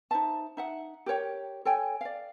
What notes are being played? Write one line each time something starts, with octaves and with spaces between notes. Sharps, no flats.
D#4 C5 E5 A5
D#4 E5 F#5
G4 A#4 C#5 G5
A4 C#5 G5 G#5
D5 F5